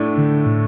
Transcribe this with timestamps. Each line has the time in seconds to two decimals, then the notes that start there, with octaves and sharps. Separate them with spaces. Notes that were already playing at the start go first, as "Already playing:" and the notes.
Already playing: A2 A3 D4
0.17 D3
0.46 A2